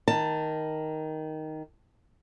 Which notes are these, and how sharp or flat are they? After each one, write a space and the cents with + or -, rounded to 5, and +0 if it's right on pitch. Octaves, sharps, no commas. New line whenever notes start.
D#3 +5 A5 +15